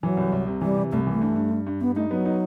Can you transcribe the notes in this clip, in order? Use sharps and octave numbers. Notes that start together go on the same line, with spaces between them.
E3 F#3
C2
C2
C3
E3 G3
C3
C2 A3
E3 A3
G2
G2
G2
G2
G2 B3
A3 D#4
F#3 B3
D#4